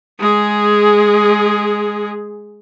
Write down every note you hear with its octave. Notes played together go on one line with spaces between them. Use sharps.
G#3 G#4